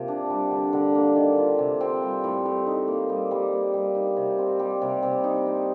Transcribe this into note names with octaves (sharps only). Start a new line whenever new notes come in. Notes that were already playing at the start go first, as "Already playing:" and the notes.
Already playing: C3 F3 A#3
D4
G3
D3
D3
A#3
D#3
F4
C3
C4
G3
A2
A2
D#4
A#3
G3
G3
A#3
G3
D#4
C3
C4
G3
C3
C3
D#4
C4